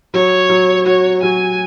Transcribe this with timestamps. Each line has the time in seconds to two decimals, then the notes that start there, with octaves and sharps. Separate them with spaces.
0.13 F#3 C#5
0.49 F#3
0.86 F#4 C#5
1.23 F#3 G#5